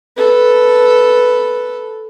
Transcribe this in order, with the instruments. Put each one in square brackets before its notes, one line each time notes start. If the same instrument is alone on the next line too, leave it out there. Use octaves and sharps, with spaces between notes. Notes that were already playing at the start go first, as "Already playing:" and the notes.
[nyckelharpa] A4 B4